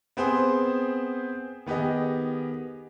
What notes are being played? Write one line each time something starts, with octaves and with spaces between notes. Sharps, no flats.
B3 C4 G#4 C5
D#3 B3 G4 G#4 D#5